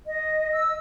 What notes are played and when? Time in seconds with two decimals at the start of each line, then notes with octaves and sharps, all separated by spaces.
0.06 D#5
0.52 E6